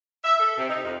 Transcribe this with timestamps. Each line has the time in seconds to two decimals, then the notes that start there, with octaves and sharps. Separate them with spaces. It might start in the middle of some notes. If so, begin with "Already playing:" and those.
0.23 E5
0.40 A4
0.57 C3
0.69 D#4
0.83 F2